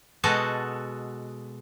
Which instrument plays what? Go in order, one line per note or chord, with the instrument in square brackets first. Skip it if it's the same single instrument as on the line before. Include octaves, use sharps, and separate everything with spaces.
[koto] B2 G#3 F#4 A4 D#5 A5